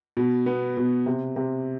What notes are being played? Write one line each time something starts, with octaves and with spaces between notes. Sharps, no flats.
B2
B3
B2
C3
C3